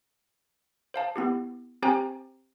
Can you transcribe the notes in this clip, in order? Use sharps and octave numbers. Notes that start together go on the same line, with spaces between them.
C5 F5 A5
B3 E4 G4
C4 G4 C5 G5 G#5 A#5